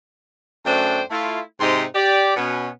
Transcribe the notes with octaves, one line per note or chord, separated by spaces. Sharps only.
F#2 A3 D4 C5 G5 A5
A3 E4 F4
G#2 C3 C4 D#4 G4 C6
G4 D5
B2 B3 C#4